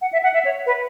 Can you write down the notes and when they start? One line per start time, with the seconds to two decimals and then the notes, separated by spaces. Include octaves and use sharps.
0.01 F#5
0.12 E5
0.23 F#5
0.34 E5
0.45 C#5
0.66 B4